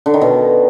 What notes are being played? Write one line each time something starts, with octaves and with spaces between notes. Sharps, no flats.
D3
D#3
B2